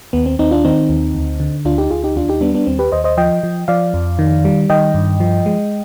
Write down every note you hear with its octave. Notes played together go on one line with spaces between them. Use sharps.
D#2 B3
C4
D#2 C4 D#4
D4 F4
D#3 C4 D#4
D#2
D2
D3
D2 D4 F4
D#4 G4
D2 F4 G#4
D#4 G4
D#2 D4 F4
D#4 G4
G3 B3 D4
B3 D4
D#2 C4
G4 B4
D#2 C5 D#5
C5 D#5
F3 D#5 G5
F3
F3 D5 F5
F2
D#3
G3
D#3 D#5 G5
G2
F3
G#3